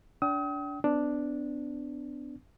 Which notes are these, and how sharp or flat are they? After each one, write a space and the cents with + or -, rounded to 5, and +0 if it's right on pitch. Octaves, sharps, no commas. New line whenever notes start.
D4 -30 G5 -35 D#6 +40
B3 +35 D4 +0